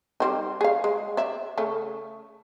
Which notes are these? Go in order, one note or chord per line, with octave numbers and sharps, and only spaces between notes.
G3 C4 D#4
G#4 F5
G#3
D5 E5
C#3 A3 C#4